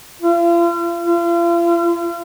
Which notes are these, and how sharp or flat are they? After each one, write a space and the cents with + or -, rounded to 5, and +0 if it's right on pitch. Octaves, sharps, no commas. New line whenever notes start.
F4 -40
F4 -40